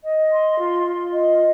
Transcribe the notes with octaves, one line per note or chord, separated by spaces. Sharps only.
D#5
C6
F4
F4
D#5